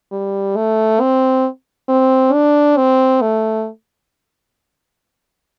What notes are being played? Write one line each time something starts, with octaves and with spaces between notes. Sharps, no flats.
G3
A3
C4
C4
D4
C4
A3